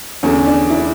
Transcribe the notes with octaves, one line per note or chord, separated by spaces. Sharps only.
E2 D3 C#4
D4
E4